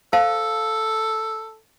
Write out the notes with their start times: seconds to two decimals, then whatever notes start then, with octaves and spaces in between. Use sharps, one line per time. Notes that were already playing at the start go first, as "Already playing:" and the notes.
0.13 A4 C5 F5 A5